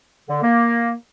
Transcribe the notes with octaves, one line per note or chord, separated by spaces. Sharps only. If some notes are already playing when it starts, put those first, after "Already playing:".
D3
A#3